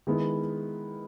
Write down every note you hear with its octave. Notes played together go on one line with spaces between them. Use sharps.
D#3 G#3 B3 E4